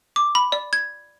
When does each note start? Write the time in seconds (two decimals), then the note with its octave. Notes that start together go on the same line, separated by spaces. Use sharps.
0.16 D6
0.35 B5
0.52 D5
0.73 G#6